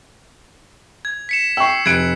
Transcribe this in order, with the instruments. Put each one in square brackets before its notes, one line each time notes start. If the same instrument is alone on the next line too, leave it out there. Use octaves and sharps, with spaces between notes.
[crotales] G#6
B6 C#7 E7
[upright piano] G5 C#6 [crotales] E6 C7
[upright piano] F1 F#6 D7 [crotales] G#6 C#7